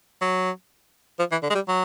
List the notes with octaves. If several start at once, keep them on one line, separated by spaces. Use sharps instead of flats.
F#3
F3
E3
D3
G#3
G3
F#3